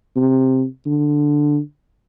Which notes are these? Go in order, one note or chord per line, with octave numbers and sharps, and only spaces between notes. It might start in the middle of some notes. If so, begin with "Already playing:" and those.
C3
D3